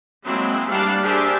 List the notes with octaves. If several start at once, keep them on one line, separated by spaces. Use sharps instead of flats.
F#3 G#3 A#3 C4 E4
G3 A#3 D4 F5 F#5 A5
D4 G4 G#4 A#4 C5 E5